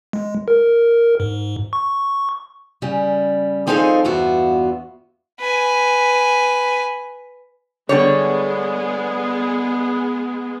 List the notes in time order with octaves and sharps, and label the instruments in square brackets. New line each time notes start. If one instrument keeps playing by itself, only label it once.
[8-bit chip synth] G#3
A#4
G#2
C#6
[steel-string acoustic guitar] C#3 G3
F3 C4 D#4 G#4 A4 F5
E2 G2 B3 F4 F#4 E5
[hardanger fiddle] B4 G#5
[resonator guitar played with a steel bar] D3 G3 C#5 [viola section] G#3 B3 G#4